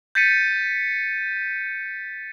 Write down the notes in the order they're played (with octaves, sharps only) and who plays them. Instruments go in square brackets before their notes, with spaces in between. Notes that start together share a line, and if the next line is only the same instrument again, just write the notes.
[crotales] G6 A6 B6 C#7 D#7